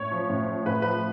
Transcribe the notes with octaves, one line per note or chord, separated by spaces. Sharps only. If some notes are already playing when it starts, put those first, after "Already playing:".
Already playing: A2 C#5
F3
A2
F3
A2 B4
F3 B4